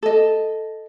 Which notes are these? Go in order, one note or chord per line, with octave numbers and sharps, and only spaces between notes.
A4 D#5